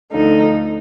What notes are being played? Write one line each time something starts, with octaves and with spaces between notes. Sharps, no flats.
D2 D3 F3 D#4